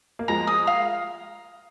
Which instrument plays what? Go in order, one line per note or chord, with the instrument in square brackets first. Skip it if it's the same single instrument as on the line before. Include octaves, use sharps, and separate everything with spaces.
[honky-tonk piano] A#3
[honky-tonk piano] F3 G#3 [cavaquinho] A#5
[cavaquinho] D#6
F5